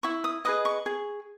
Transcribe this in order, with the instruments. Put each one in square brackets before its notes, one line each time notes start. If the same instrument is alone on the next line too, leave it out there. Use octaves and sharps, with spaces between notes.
[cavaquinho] E4 C#6
D#6
G#4 B4 D#5 D#6
C#6
G#4